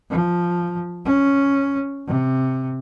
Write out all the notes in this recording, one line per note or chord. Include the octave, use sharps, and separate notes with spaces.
F3
C#4
C3